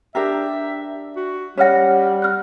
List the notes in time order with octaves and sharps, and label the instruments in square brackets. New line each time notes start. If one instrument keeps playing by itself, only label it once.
[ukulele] D4 G4 A#4 [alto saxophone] E5
[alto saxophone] F#4
[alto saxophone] G3 [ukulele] C#4 F#5 [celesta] C#5 F6 A#6
[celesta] F6 F#6